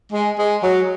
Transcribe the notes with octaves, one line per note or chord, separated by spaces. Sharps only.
G#3
G#3
F#3